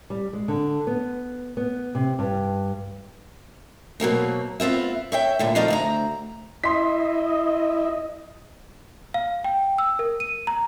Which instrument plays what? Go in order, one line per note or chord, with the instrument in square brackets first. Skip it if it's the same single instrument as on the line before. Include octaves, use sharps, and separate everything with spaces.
[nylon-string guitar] G3
G#3
D3
B3
B3
C3
G2
[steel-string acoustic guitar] B2 F#3 A#3 C4
B3 C4 F4 E5
C#5 E5 G5
A#2 D3 E4
F2 A3 D#4 C5 D5 F5
D2 C4 A#5
[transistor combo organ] E4 [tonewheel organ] D#5 [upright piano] C6 B6
[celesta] F5
G5
E6
A#4
D#7
A#5